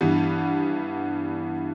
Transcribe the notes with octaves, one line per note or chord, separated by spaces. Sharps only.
G2 E3 G3 B3